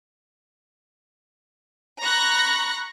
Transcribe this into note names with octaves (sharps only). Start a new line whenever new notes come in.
A#5 B5 C#6 F#6 A#6